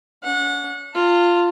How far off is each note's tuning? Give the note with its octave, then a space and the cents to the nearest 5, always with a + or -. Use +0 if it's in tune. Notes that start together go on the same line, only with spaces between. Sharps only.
C#4 +40 F#5 -25
F4 +0 A5 +40